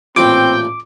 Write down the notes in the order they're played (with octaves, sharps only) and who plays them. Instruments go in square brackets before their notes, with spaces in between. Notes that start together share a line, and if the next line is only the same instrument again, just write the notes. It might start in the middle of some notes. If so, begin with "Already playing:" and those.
[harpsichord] A1 A#2 E3 [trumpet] C4 [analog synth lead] G5 [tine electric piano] D6